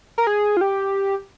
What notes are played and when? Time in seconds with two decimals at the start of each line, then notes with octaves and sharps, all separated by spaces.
0.18 A#4
0.27 G#4
0.57 F4
0.61 G4